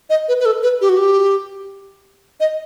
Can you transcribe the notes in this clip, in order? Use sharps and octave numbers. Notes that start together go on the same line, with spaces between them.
D#5
B4
B4
A4
B4
G4
F#4
G4
D#5